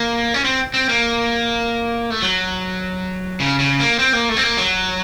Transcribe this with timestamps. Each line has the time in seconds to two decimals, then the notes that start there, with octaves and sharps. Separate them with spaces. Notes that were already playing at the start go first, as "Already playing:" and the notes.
Already playing: A#3
0.34 C#4
0.44 C4
0.74 C4
0.89 A#3
2.10 A3
2.22 F#3
3.40 C#3
3.59 C#3
3.80 A#3
3.99 C4
4.13 A#3
4.29 A3
4.37 C4
4.43 A#3
4.58 F#3